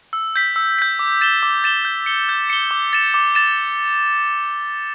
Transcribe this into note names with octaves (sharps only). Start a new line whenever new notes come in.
E6
G6 B6
E6
G6 B6
D6
A6 E7 G7
D6
A6 E7 G7
G6
C#7 G7
G6
C#7 G7
D6
A6 E7
D6
A6 E7